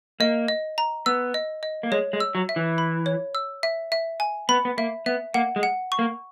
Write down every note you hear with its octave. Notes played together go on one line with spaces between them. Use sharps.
A#3 D#5
D#5
A#5
B3 E6
D#5
D#5
A#3
G#3 C#5
G#3
E6
F#3
E5
E3
B5
C#5
E6
E5
E5
G#5
B3 B5
B3
A#3 E5
B3 E5
A#3 F#5
G#3
F#5
C#6
A#3